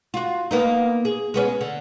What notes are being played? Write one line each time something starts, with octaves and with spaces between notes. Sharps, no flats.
F4 F#4
A#3 B3 D#4
G#4
G#3 B3 C#4
D3